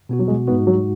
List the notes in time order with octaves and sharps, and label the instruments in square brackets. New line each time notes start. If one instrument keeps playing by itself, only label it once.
[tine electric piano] B2 B3 F#4
[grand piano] F#3
G#3
[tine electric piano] G#2 G#3 D#4 F#4 [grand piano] B3
[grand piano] F#3